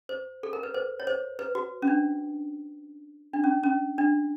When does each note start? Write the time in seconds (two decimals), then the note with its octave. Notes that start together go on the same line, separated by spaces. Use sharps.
0.09 C5
0.43 A4
0.53 A#4
0.63 B4
0.74 C5
1.00 C#5
1.07 C5
1.39 B4
1.55 F#4
1.82 C#4
1.87 D4
3.33 D4
3.44 C#4
3.63 C#4
3.98 D4